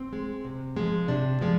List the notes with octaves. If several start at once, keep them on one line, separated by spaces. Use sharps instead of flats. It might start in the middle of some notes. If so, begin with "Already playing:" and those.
Already playing: C4
G#3
C3
F3 G#3
C3 D4
F3 G#3